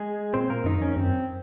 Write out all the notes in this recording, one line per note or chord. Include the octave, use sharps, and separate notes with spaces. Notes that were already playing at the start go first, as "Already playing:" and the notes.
Already playing: G#3 G#4
A#2 C4 C5
A#3 A#4
F#2 D#3 D#4
F2
C#4
F#2 C4